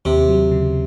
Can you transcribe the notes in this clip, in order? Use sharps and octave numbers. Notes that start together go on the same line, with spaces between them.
D#2 C3
F#3
C#3